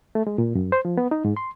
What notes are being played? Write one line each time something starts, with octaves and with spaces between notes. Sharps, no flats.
A3
G#3
A#2
F#2
C5
F3
B3
D#4
G#2
C6